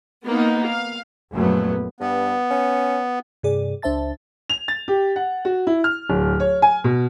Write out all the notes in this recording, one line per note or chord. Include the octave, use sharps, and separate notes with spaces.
A#3 B3 D#4
F5
A#1 F#2 A#2 F#3 A3 B3
G2 B3
C#4
G2 C3 G#4 D5
C#2 D4 C5 E5 A5 A6
F7
A6
G4
F#5
F#4
E4
F6
D1
C#5
G#5
B2